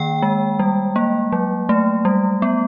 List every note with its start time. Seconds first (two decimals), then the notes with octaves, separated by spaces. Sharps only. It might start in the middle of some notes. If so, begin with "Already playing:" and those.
Already playing: D#3 A#3 G5
0.22 G#3
0.59 G3
0.96 A#3
1.32 F#3
1.69 A3
2.05 G3
2.42 B3